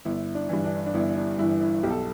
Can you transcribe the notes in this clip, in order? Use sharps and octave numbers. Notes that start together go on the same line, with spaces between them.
G1 E4
D4
G2 E3
D4
D4
G1 E4
D4
G2 E3 E4
E4
B1 G4
A4